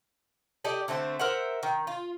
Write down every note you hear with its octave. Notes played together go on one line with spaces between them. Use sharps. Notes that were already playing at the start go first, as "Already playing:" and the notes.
G4 A4 D5 D#5
D3 A3 C4 C5
A#4 C5 E5 F#5
D#3
F4